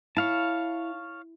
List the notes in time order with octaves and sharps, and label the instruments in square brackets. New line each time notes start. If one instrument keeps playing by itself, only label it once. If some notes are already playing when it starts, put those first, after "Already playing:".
[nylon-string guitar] E4 [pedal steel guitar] C#5 F5 A5